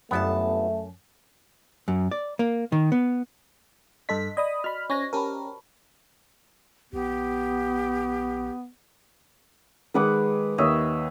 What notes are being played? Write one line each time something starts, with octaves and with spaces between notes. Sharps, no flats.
G1 F#2 A3 B3 G4 A5
F#2
D5
A#3
D#3
B3
G2 A4 D#5 C6 B6
D5 D#5 B5 D#6
F#4 D#5 B5 F6
C#4 C5 G#5 C#6 A#6
C#4 G4 A#4 A5 B5
A#1 B3 G4
D#3 G#3 G#4 B4 F#5 D6
D#2 D#3 C#5 D#5 E5